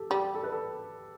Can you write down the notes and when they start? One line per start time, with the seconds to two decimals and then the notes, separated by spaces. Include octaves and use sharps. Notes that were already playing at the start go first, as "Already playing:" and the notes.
Already playing: G4 A4
0.10 G3 G4
0.35 A4
0.43 B4
0.52 A4